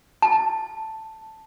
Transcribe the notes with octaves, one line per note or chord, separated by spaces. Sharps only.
A5